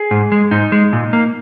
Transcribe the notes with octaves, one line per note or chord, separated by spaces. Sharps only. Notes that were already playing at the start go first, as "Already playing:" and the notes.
Already playing: G#4
G#2
G#3
G#2 D#4
G#3
A#2
A#3